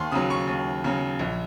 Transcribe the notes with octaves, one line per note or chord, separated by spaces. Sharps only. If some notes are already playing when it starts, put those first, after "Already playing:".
Already playing: D#2 C6 C#6
C#3 F#3 D#6
C#6
D#2
C#3 F#3
A#1